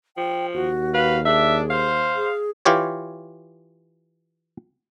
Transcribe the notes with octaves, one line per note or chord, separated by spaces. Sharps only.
F3 G5
D#2 F#4
B4 F5
D4 G#4 E5
C5 F5
G#4
E3 F4 G4 C#5